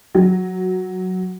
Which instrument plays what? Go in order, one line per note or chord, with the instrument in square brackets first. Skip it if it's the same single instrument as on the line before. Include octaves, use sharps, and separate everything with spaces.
[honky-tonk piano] F#3